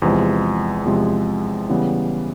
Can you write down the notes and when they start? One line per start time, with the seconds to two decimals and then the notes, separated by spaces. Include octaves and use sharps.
0.02 E2 C3 F3 G#3
0.85 E2 C3 F3 G#3
1.69 C#3 E3 G3 B3